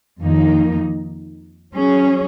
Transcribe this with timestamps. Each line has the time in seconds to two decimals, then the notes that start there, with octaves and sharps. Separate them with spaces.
0.21 F2 D#3 A#3 D#4
1.73 F#3 C#4 G#4